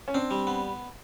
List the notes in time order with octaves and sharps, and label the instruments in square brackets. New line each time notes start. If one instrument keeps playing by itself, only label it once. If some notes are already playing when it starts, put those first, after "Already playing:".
[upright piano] C#4
[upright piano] C4 [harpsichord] D4
[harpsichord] G3
B3